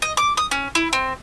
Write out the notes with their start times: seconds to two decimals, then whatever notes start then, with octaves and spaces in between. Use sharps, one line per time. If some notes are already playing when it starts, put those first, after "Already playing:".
0.02 D#5
0.17 D6
0.37 D#6
0.51 C#4
0.75 E4
0.93 C4